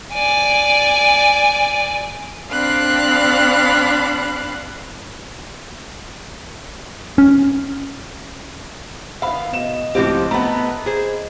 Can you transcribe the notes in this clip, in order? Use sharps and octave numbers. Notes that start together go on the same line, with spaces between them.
D5 G#5
C4 D4 F5 B5 F#6
C#4
D#3 B3 E5 F5 B5
B2 D#5 E7
C#2 A2 F3 C4 G4
A3 B3 A#5 B5
G#4 C5